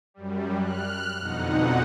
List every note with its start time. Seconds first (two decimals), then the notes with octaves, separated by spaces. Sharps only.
0.14 F#2 G3
0.59 F6 F#6
1.19 F2 B2 D3 D#4 F#5